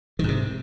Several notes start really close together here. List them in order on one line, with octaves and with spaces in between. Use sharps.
D#3 G#2 C3